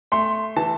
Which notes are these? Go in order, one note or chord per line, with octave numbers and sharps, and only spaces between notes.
A3 C6
E3 A5